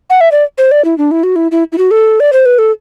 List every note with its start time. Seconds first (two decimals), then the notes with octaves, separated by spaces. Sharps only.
0.10 F#5
0.21 E5
0.32 D5
0.58 C5
0.71 D5
0.85 E4
0.98 D4
1.11 E4
1.23 F#4
1.36 E4
1.52 E4
1.72 E4
1.78 F#4
1.91 A4
2.20 D5
2.33 C5
2.46 B4
2.59 A4